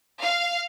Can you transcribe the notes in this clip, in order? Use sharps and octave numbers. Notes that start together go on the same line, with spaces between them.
F5